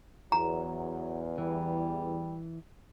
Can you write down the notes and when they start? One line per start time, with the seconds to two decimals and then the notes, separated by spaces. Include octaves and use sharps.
0.32 E2 F#3 A#5
1.38 E3 G3